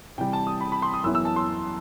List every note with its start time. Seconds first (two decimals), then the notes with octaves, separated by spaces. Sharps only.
0.18 C3 E3 G3 G5
0.33 A5
0.47 D#6
0.61 B5
0.72 B5
0.82 C6
0.94 D#6
1.04 F#2 E3 B3 E4 E6
1.15 E6
1.25 A5
1.36 C6